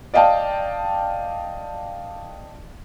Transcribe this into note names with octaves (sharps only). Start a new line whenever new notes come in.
D5 D#5 F5 G5 A5